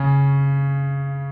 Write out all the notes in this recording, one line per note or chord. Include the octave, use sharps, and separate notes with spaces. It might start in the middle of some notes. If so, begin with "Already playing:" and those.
Already playing: C#3 C#4